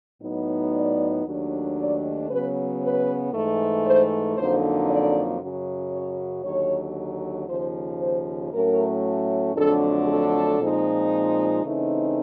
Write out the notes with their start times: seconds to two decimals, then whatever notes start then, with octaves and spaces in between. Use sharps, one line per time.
0.22 A2 F#3 B3 D#4
0.74 D5
1.25 D#2 D#3 F#3 A3 D4
1.77 D5
2.30 C#3 F#3 B3 B4
2.82 B4
3.33 G#2 E3 A3
3.85 C5
4.37 F2 D3 F#3 A#3 D#4 C5
4.89 D5
5.41 F#2 C#3 F#3
5.92 C#5
6.44 D#2 D3 F#3 C#5
7.48 D#2 C#3 F3 C5
8.00 C5
8.52 A2 F#3 A3 C#4 A#4
9.56 F2 D3 F#3 A3 D4 A4
10.08 A4
10.59 A#2 F3 G#3 C4 D#4
11.63 C#3 E3 A3 C4 D#4